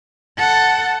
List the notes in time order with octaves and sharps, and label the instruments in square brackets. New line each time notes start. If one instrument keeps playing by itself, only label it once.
[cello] A4 F#5